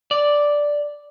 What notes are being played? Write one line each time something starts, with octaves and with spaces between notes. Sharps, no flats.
D5